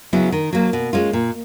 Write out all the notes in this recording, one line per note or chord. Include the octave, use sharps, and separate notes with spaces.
C#3 F#3 B3 E4
D#3
F#3 A#3
B2
G#3 C#4 F4
A#2